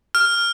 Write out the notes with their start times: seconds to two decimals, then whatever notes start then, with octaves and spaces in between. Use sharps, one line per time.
0.15 F6